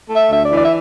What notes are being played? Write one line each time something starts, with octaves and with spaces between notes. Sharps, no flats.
A3
E5
D2 E5
D5
E3
D5
E5